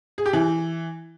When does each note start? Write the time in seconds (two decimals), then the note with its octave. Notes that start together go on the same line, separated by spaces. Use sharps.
0.18 G#4
0.26 G4
0.33 E3